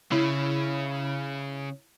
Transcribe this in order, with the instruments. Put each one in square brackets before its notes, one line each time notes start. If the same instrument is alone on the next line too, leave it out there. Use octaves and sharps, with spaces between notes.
[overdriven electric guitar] C#3 [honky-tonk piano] E4